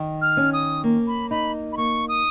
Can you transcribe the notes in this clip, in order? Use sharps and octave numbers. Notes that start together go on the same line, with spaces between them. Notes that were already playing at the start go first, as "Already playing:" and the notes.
Already playing: D#3
F6
C#4
D#6
A#3
B5
D#4 B5
B5
A#3 C#6
D#6